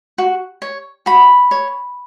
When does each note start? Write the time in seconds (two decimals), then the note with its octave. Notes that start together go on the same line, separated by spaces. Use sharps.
0.18 F#4
0.62 C#5
1.06 F#4 B5
1.51 C#5